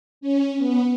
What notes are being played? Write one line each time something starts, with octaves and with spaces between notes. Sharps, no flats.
C#4
B3